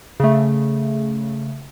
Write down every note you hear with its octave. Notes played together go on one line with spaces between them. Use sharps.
C#3 A3